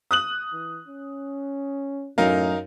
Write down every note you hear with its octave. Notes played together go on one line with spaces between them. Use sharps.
D#6 F#6 F#7
E3
C#4
F#2 A2 D#4 A#4 F5